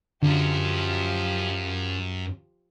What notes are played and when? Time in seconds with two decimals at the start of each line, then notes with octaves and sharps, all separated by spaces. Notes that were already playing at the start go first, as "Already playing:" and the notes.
0.23 F#2 D3 F3 F#3 F4 G4